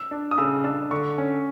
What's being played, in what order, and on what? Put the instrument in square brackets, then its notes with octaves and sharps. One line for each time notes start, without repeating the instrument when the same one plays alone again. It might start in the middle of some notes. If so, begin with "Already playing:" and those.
Already playing: [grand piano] E6
[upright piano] D4
[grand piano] D#6
[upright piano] C#3 [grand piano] E6
[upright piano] D4 [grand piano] E6
[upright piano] D3 [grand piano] C#6
[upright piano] C#4